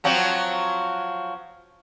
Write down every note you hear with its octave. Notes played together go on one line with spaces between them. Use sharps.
F3 F#3 C4